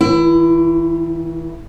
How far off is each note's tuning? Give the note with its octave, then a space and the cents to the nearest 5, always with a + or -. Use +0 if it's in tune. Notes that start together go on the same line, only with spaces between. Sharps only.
E3 -35 E4 +25